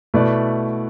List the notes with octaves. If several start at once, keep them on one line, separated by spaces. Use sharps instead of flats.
B2 A3 E4 B4 D5